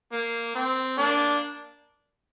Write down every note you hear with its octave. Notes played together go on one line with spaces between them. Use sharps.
A#3
C4
A#3 D4